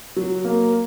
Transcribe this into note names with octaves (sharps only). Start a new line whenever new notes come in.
F#3
A#3